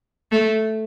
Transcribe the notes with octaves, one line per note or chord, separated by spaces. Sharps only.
A3